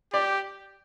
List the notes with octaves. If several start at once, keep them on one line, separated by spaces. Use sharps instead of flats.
G4 D5